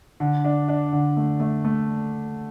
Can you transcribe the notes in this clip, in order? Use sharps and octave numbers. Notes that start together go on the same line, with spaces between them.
D3
D4
D4
D3
A3
A3
A3